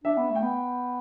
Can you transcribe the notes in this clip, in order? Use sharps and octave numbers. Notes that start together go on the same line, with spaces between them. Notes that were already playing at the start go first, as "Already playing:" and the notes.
D4 E5
B3
A3
G5
B3